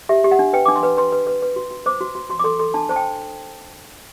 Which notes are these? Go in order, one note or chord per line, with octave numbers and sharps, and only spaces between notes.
G4 E5
G4
F#5
D4
B4 G5
D4 D6
C6
B4
B4 C6
B4
B4
B4
F#4
F#4
C5 D6
F#4
F#4
F#4 C6
D6
A4 C6
A4 C6
D4 A5
C5 A5
G5